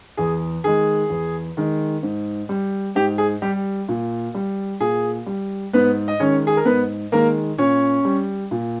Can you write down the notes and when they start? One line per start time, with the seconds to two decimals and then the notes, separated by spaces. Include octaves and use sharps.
0.17 E2 G#4
0.64 D#3 G#3 G#4
1.10 E2
1.57 D#3 G#3
2.03 G#2
2.49 G3
2.95 G#2 G4
3.18 G#4
3.42 G3 G4
3.88 A#2
4.34 G3
4.80 A#2 G#4
5.26 G3
5.73 G#2 B3 B4
6.08 D#5
6.20 D#3 G#3 C#4 C#5
6.47 G#4
6.57 A#4
6.65 G#2 B3 B4
7.12 D#3 G#3 A#3 A#4
7.58 A#2 C#4 C#5
8.05 G3
8.51 A#2